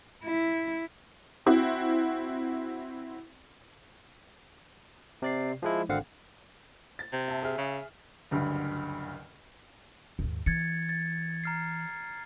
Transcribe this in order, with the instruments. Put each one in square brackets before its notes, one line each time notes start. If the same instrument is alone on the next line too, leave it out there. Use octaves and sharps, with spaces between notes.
[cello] E4
[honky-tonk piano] C4 E4 F#4
[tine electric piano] C3 D5 C7
F3 G#3 E4
G#1 D3 C4 F5 F#5
[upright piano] A6
[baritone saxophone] C3
[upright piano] E5 A5
G#4 E5 F6
[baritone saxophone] C#3
[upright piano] F#1 D2 G2 D3
[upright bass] D#2 G#2
[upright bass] E3 [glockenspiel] G#6 A6 C#7
[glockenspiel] A6
A#5 F6 C7